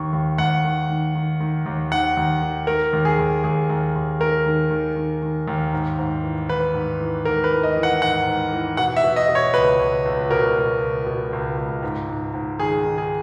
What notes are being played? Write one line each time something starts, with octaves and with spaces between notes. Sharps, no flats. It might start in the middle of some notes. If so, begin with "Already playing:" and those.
Already playing: D#2 D#3 C#6
D#2
D#2 F#5
D#3
D#3
D#3
D#3
D#2
D#3 F#5
D#2
D#3
D#3 A#4
D#2
G#4
D#2
D#2 G#4
D#2
D#2
D#3 A#4
D#3
D#3
D#3
D#3
D#2
G#2
G#2
E3
G#2 B4
G#2
E3
G#2 A#4
B4
E3
D#5
E3
F#5
G#2 F#5
G#2
E3
B2 F#5
E5
B2
D#5
B2
C#5
C#2 B4
C#2
C#2
B2 A#4
B2
C#2
B2
C#2
C#2
G#2
G#2
G#2
D#3 G#4
D#3
G#4